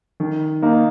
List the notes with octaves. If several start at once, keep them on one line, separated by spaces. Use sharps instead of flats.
D#3
A#3 D#4